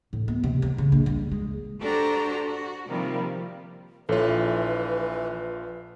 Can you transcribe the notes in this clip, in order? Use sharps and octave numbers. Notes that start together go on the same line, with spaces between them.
A2
B3
C3
F#3
C#3
A#1
G3
G#3
D4 F#4 G4 A4 C5 A#5
F#4
C3 D#3 F3 G3 A#3
A#1 E3 F4 A4 B4 C#5